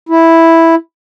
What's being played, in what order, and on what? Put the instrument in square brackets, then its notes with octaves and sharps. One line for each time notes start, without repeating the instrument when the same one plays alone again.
[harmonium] E4